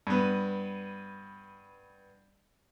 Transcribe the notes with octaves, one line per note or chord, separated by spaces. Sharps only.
G2 B3